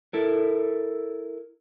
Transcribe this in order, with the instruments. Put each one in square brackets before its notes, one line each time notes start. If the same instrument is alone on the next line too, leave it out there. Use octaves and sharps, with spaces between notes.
[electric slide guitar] E4 A4 A#4